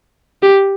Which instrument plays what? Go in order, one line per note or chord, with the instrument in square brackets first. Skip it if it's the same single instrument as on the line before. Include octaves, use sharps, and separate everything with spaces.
[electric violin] G4